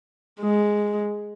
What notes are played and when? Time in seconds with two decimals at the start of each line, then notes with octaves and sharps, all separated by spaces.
0.40 G#3